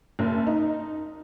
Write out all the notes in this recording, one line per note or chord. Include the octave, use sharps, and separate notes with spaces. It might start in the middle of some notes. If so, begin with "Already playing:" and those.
F#1
D#4